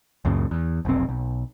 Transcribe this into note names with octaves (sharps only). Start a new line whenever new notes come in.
C#2 F#2 A#2 C#3
E2
F1 B1 C4
B1